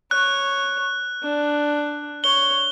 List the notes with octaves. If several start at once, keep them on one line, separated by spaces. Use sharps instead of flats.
C#5 F#6
D4
C#5 G7